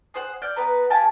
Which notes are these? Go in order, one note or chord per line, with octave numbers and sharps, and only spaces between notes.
G#4 C5 F#5
D5 F6 G6
B3 B4 A#5
F4 G4 G#5 A5